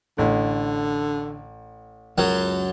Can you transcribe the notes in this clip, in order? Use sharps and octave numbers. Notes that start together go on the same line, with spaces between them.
A1 D3
C#2 F#2 F#3